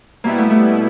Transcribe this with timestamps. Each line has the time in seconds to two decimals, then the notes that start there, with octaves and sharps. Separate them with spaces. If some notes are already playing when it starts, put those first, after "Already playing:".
0.24 B2 G3 A#3 B3 E4
0.38 A3
0.50 A3